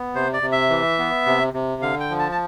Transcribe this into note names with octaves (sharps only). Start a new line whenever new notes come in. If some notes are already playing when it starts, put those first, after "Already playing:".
Already playing: B3
C3 C5
D5
C3
E5
E3
B3
C3
C3
D3 F5
G5
F3
A5
A5